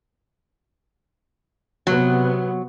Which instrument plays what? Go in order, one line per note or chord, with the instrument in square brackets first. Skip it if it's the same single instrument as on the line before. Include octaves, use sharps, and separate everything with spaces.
[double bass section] C3 B3 [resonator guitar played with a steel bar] F#3